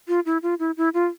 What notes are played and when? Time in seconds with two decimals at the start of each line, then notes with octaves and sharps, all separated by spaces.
0.08 F4
0.26 E4
0.43 F4
0.59 E4
0.77 E4
0.94 F4